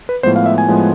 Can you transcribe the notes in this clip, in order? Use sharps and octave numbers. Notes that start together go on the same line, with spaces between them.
B4
A2 F3 G#3 B3 C5
F5
E5
G#5
A2 F3 G#3 B3